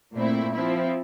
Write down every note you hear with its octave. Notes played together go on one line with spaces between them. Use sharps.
A#2 A3 C4 E4
F3 C4 E4